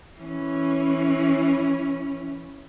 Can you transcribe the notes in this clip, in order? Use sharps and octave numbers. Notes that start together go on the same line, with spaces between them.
E3 C#4